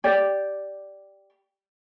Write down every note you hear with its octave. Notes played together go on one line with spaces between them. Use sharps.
G4 D5